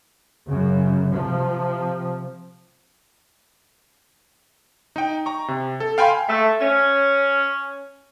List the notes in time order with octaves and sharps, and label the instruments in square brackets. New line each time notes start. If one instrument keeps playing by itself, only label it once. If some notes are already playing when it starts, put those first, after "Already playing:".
[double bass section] F#2 C#3
C3 F3
[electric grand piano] D#4 G5
A#5 C#6
C3
A4
F5 G5 G#5 B5 C6
[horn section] A3
C#4